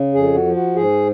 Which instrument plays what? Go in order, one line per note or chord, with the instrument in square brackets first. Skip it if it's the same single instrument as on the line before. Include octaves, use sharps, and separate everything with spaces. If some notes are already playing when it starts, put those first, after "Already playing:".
Already playing: [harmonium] C#3
F2 G#4
F#4
F3
F#4
G#2 G#4